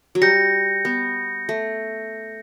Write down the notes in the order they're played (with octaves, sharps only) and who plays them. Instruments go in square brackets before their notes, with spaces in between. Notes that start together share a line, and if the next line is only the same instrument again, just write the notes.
[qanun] F#3
[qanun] G3 [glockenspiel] G6 A#6 C#7
[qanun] B3
A3